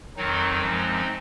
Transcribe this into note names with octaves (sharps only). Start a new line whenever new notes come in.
F2 D#3 F#3 C4 D#4
F#2 F3 G#3